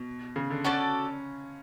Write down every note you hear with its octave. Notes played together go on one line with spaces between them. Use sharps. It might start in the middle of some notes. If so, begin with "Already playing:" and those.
Already playing: B2
C#3
D3
C#4 F#4 A4 D5